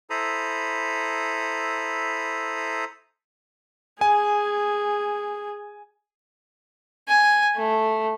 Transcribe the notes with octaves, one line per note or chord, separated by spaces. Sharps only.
E4 A4 C5 A#5 B5 D#6
G#4 G#5
G#5
A3